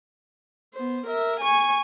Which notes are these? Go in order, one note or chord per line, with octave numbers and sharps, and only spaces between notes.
B3 C5
A#4 E5
G#5 C#6